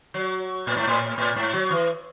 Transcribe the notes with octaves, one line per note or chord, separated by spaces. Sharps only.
F#3
A2
G#2
A2
A2
G#2
F#3
E3